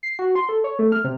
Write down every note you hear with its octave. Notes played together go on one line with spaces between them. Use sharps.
C7
F#4
C6
A4
C#5
A3
F6
C3